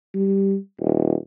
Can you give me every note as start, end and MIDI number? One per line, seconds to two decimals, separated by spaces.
0.15 0.57 55
0.80 1.14 27